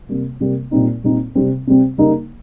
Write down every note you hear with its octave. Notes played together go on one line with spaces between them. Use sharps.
C3 G3 A#3
C3 G3 A#3
A#2 G3 C4 D#4
A#2 G3 C4 D#4
C3 G3 C4
C3 G3 C4
C#3 G3 A#3 D#4